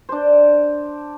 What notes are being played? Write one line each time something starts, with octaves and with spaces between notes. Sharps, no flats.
D4 C5